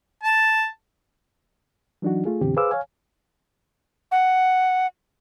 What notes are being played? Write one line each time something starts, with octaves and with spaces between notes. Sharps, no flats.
A5
E3 F#3 D4 D#4 F#4
A3 F4 G#4
F#2 B2 D3 E3 C4 G4
G#4 B4 C5 F5 D6 E6
C#5 F5 G#5
F#5